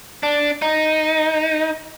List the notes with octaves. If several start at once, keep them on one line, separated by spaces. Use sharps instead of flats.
D4
D#4